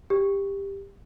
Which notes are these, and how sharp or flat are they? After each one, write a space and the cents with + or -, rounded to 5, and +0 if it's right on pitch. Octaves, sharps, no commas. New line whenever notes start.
G4 +15